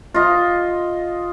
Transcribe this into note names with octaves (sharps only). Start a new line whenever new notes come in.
F4 D#5